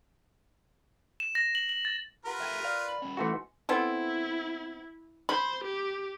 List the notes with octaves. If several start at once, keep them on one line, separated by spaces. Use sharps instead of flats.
E7
A#6
F#7
F#7
A6
F4 G4 A#4 B4 F#5
G4 A4 E5 G5 G#6 D#7
D5 F5
B5 F#7
G3 C#4
E3 A3 F#4 G#5 C6 C#7
B3 C4 E4 A4
C5 B5
G4